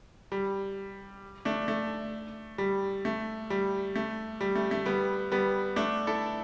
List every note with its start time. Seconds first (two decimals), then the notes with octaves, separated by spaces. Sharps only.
0.32 G3
1.45 A3 D4
1.68 A3
2.58 G3
3.05 A3
3.50 G3
3.96 A3
4.41 G3
4.56 A3
4.71 A3
4.86 G3 B3
5.32 G3 B3
5.76 A3 D4
6.07 E4 A4